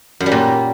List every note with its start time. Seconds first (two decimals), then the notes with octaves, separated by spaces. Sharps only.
0.20 F#2
0.26 G3
0.32 A#2